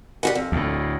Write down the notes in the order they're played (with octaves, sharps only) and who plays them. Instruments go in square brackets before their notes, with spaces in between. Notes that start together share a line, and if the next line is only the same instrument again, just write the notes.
[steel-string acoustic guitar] G3 F#4 F#5
F2
[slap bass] D2 A2